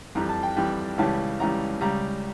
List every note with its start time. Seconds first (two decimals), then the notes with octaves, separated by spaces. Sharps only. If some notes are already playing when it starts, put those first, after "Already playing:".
0.15 F2 E3 G3 A#5
0.29 A5
0.43 G5
0.57 F2 E3 G3 G5
0.98 C#2 C#3 E3 G3 A5
1.40 C#2 C#3 E3 G3 A#5
1.81 C#2 C#3 G3 A#5